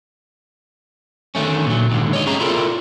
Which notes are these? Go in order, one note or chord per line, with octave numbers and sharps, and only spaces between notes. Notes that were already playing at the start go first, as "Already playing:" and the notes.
D3 D#3 G#3 A3 C#4
A#2 F#3
D#2 G#2 D3
C#5 D#5
G3 C#4 G#4 E5 A#5
E4 F4 A4 A#4 D5